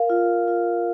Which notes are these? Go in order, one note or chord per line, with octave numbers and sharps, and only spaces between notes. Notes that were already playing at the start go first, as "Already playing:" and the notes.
Already playing: A#4 F5
F4
F4